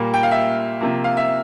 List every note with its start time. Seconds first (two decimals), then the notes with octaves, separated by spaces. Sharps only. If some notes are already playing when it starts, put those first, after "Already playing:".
Already playing: A#2 G3 A#3
0.14 G5
0.23 F5
0.31 E5
0.81 C3 F3 A#3
1.04 F5
1.17 E5